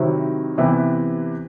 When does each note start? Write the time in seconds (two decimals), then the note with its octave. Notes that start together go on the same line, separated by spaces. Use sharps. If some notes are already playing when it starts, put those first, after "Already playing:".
Already playing: C3 D#3 F#3 C4 E4
0.58 C3 E3 B3 E4 G4